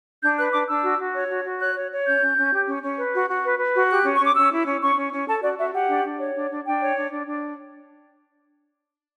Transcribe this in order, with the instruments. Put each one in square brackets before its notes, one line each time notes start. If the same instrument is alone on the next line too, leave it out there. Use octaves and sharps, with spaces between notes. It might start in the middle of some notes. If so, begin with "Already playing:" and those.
[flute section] D4 G6
B4 F#6
D4 D6
D4 E6
F#4
F#4
C#5
F#4
F#4
C#5 F#6
C#5
C#5
C#4 G6
C#4
C#4
G4
C#4
C#4
B4
F#4
F#4
B4
B4
F#4
G4 F#6
C#4
C#6
C#4 D6
C#4 E6
E4
C#4
C#4 C#6
C#4
C#4
A4 A5
F#4 D5
F#4 E5
G4 F#5
D4
D4
C#5
D4
D4
D4 G5
C#5
D4
D4
D4